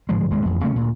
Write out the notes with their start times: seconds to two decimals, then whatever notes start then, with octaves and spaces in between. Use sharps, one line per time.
0.09 D1 G#2 F3 G#3
0.31 D1 G2 G#3
0.45 A1 F2
0.62 C#3 A3 A#3 C#4
0.76 D2 A#2